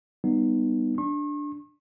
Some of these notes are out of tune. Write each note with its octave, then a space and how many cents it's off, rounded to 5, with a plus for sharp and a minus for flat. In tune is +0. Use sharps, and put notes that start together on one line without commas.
G3 +0 B3 +0 D#4 -15
D4 +0 C#6 -45